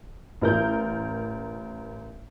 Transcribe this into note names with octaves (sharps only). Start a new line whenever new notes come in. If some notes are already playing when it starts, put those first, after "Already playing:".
A1 A#4 G6